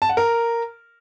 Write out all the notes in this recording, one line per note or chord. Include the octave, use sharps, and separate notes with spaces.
A5
F#5
A#4